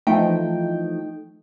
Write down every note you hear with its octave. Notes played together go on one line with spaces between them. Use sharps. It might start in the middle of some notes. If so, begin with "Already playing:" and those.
E3 F3 A3 D#4 G5